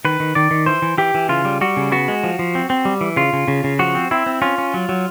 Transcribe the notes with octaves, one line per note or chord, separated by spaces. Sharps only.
D#3 B4
D#3
D#3 D5
D#3
E3 C5
E3
E3 G4
E3
C#3 F4
G3
G3 F#4
C#3
B3 F#4
G#3
F3
F3
C4
C4
G3
E3
C#3 F4
C#3
C#3
C#3
F3 F#4
C4
C4 E4
C4
C#4 F4
C#4
F#3
F#3